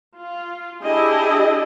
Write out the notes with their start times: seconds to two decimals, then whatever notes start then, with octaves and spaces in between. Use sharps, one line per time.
0.16 F4
0.83 D4 E4 G4 G#4 D#5